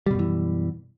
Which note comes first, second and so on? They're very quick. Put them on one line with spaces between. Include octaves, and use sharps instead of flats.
G3 B2 F#2 E3